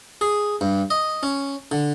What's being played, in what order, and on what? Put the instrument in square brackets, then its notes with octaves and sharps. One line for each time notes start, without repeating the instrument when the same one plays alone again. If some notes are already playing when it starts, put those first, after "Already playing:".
[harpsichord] G#4
G2
D#5
C#4
D3